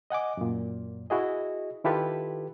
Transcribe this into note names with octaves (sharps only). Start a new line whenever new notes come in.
D#5 F#5 G#5 D6
F#2 A#2
E4 F#4 G#4 D#5
D#3 E4 F4 G4 A4 B4